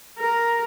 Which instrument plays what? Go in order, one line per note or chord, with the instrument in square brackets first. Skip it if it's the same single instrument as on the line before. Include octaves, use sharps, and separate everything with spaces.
[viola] A#4